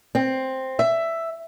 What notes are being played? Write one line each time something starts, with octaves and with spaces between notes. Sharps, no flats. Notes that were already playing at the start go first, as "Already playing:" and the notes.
C4
E5